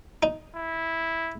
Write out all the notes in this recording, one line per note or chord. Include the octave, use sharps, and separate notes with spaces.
D#4
E4